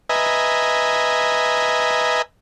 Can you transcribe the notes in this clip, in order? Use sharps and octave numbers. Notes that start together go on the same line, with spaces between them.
B4 D#5 E5 G#5 A#5